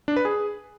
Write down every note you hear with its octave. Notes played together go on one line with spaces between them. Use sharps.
D4
B4
G#4